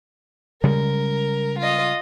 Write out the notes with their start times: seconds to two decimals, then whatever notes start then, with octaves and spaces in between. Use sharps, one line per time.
0.64 C#3 G3 G#3 A#4
1.59 F4 D#5